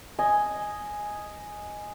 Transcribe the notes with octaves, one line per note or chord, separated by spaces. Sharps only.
D#5 G#5